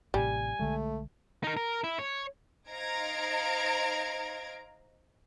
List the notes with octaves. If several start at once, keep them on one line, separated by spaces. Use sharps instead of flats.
A1 A2 C3 G3 G#5
B1 D3 G#3 A3
D#4 A#4
A#4
E4
C#5
D#4 C5 F5 A#5 G#6 D7